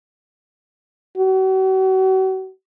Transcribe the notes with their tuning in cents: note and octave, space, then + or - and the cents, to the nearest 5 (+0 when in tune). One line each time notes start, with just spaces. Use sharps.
F#4 +40